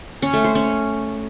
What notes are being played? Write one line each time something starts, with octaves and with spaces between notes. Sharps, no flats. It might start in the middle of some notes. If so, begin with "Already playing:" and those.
C#4
A3
C5
C#4